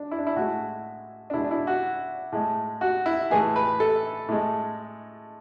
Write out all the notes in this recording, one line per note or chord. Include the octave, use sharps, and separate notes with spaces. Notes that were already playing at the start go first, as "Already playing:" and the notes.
Already playing: D4
E4
D4
E4
A2 G#3 F#4
D4
B2 G#3 E4
D4
E4
F#4
A2 G#3
F#4
E4
A2 E3 G#3 G#4
B4
A4
A2 G#3